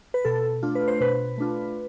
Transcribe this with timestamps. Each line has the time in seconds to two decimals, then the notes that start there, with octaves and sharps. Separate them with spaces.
0.14 B4
0.25 B2 A4
0.63 A3 D4 F4
0.75 B4
0.88 C5
1.00 B2 B4
1.38 A3 D4 F4